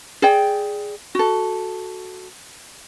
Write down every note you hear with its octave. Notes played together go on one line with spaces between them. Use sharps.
G#4 D5 G5
F#4 A4